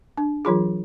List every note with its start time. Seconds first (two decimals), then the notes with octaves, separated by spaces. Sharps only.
0.17 D4
0.45 E3 F#3 F4 G#4